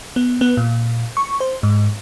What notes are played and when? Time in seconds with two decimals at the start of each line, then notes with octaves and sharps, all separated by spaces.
0.16 B3
0.41 B3
0.57 A#2
1.17 C#6
1.40 C5
1.63 G#2